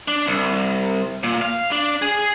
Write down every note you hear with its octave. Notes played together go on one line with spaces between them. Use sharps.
D4
C2
A#2
F5
D4
G#4